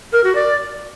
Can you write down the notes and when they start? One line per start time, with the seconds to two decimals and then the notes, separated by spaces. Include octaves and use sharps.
0.12 A#4
0.23 F#4
0.35 D5